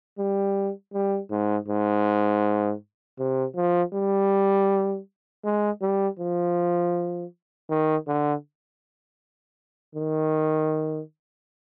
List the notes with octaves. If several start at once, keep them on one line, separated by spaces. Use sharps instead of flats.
G3
G3
G#2
G#2
C3
F3
G3
G#3
G3
F3
D#3
D3
D#3